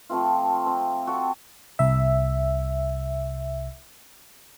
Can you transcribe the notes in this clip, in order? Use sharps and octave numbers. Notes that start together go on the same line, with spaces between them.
F3 A3 C4 F4
C4
F#4 A4 G5
C2 E5